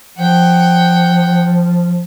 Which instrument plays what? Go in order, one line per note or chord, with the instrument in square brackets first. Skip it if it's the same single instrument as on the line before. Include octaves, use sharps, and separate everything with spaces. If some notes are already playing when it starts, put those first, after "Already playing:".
[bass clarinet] F3 [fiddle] F#5 G5